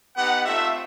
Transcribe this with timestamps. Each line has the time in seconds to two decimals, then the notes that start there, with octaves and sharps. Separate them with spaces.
0.15 B3 D#4 G4 F#5
0.45 A3 C4 F4 E5